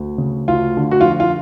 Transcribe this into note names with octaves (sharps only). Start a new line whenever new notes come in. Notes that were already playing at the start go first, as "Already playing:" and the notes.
Already playing: D2
C#3
D2 F4
D3
F#4
F3 F4
F4